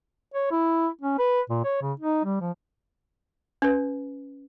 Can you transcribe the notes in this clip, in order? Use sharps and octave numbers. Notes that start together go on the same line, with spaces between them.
C#5
E4
C#4
B4
A#2
C#5
C#3
D#4
G3
F3
C#4 B4